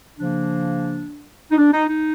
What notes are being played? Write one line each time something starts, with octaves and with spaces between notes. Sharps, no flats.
C#3 F3 A#3 D4
D#4
D4
D#4
D#4